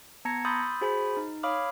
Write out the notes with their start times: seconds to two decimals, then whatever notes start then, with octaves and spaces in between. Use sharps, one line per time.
0.25 B3 A5 A#5 G#6 A#6 C#7
0.45 B5 C6 D#6 E6 G6 A6
0.81 F#4 G#4 C5 G#5 B5
1.17 D#4
1.43 C#5 F5 B5 D6 D#6 F6